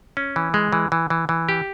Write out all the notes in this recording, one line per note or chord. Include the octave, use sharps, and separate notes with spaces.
C#4
E3
G#3
E3
E3
E3
E3
G4